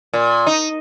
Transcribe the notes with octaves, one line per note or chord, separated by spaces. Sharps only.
A#2
D#4